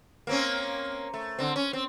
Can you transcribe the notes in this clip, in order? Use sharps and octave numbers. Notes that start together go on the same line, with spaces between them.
A#3 C4 C#4
A3
D3 C4
C#4
C4